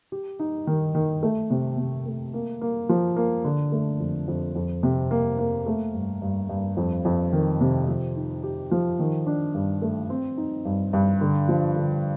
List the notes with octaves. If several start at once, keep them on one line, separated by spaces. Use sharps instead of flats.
G4
D#4
D#3
D#3
A3
C3
C3
A3
A#3
A#3
F3
A#3
D3
A3
F2
F2
F2
C3
A#3
A#3
A3
G2
G2
G2
F2
F2
D#3
C3
F3
D#4
G4
F3
D#3
D4
G2
A3
C4
D#4
G2
G2
D3
F3
D3